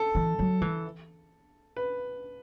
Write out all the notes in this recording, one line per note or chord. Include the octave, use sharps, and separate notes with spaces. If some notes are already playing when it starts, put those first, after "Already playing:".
Already playing: A4
E3
F#3
E3
B4